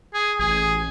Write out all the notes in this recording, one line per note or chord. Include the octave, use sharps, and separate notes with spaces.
G#4
A1 G#4